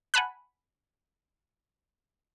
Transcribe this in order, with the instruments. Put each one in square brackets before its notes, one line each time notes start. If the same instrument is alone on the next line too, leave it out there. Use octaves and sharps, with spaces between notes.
[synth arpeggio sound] F#5 G#5 A5 B5 F#6